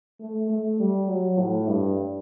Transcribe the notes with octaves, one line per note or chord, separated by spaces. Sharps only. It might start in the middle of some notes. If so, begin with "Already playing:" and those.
A3
A3
G3
F#3
A2
G2